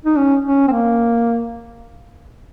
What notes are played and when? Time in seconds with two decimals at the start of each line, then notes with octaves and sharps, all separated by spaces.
0.05 D#4
0.17 C#4
0.45 C#4
0.68 C4
0.72 A#3